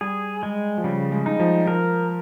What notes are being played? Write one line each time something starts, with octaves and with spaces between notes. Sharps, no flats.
G3 G#4
G#3
F3
C#3 G3
G#3
D#4
F3
F3 A#4